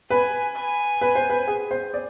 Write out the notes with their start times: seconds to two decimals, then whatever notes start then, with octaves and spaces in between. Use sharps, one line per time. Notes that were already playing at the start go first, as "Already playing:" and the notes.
0.10 B4 G#5
0.56 G#5
1.01 B4
1.15 C5
1.30 B4
1.47 G#4
1.71 C5
1.94 D5